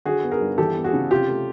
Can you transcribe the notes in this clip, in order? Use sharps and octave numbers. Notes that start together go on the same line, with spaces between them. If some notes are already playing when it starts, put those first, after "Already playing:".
D3 F#4 G#4
B3
G#4 A#4
G2
E3 G4 A4
B3
F#4 G#4
C#3
C3 F4 G4
A3